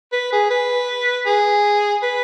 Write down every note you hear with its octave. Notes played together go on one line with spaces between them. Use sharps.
B4
G#4
B4
G#4
B4